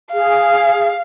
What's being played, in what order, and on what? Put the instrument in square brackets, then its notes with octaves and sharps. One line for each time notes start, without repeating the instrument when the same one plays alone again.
[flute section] G#4 [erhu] F5